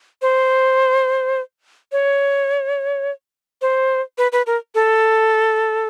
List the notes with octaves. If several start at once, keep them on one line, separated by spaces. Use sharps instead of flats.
C5
C#5
C5
B4
B4
A#4
A4